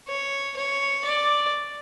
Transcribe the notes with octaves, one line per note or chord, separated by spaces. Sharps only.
C#5
C#5
D5